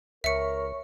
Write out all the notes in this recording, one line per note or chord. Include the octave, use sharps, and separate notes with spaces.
C#2 A#4 C#5 E5 C#6 C#7